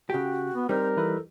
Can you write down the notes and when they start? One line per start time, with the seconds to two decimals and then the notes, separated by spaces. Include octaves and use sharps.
0.10 C#3 F#4 G4 G5
0.54 B3
0.69 G3 C4 D#4 A#4 C5
0.97 E3 E4 A4 B4